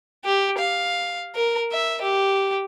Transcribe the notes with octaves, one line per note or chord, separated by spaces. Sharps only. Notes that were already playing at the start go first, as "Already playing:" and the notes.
G4
F5
A#4
E5
G4